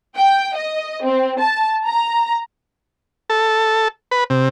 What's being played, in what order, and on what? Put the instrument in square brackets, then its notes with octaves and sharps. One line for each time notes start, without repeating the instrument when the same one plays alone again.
[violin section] G5
D#5
C4
A5
A#5
[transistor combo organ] A4
B4
C3